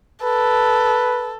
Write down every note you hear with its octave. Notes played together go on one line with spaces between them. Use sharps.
A4 B4